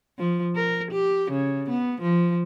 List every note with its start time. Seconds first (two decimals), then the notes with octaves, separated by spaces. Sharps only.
0.19 F3
0.56 A#4
0.91 G4
1.31 C#3
1.69 B3
2.01 F3